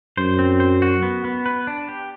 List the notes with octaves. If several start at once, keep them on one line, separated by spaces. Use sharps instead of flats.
F#2 C5
C4
C5
F#4
B3
B3
B4
D4
G4